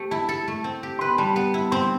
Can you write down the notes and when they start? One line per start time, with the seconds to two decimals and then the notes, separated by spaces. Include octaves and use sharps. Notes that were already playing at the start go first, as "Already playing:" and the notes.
Already playing: A3 C4 G4
0.11 E4 A5
0.29 A4
0.48 A3
0.64 C4
0.83 G4
0.99 B4 C6
1.08 B5
1.18 G3 A5
1.36 B3
1.54 E4
1.71 C4 C6